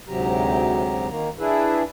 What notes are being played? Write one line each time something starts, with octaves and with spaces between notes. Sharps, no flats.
D2 G#2 C3 F#3 G4 A#5
D#3 A#3 A#5
D4 E4 G#4 B4 E5